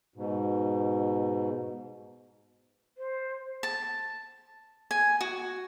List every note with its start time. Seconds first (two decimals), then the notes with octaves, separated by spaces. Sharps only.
0.16 G#2 B2
2.98 C5
3.63 A5
4.91 G#5
5.21 F#4